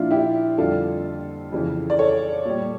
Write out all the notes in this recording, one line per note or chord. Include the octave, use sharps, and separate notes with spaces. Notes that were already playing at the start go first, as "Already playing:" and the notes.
Already playing: A#2 F3 D4 E4 F4
E4 G4
F2 D3 G3 F4 A4
F2 C#3 E3
D5
A4 C#5
A#2 G3